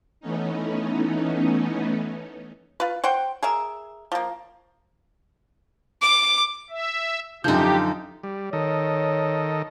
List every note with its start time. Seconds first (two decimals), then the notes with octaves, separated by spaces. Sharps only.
0.20 E3 A3 B3 C#4 D#4
2.80 F4 B4
3.04 C5 F#5 G5
3.43 G#4 A#4 E5
4.12 F3 A#3
6.02 D6
6.70 E5
7.44 F#2 D3 F3 D#4 G4 G6
8.23 G3
8.53 D#3 A4 C#5 D#5